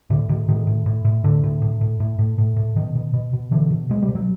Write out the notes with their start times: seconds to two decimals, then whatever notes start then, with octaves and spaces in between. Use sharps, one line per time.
0.10 A2 D3
0.29 A2 D#3
0.48 A2 D#3
0.67 A2
0.86 A2
1.05 A2
1.24 A2 D3
1.43 A2
1.62 A2
1.81 A2
2.00 A2
2.19 A2
2.38 A2
2.56 A2
2.76 B2 D#3
2.95 B2
3.14 B2
3.33 B2
3.51 B2 D3 E3
3.70 B2
3.89 B2 G#3
4.03 G3
4.08 B2
4.15 F#3